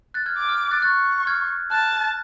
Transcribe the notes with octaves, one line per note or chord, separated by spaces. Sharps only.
F#6 A6
F6 G#6
D6
F6
F#6 A6
C#6 F#6 A6
F6 G#6
A5 F#6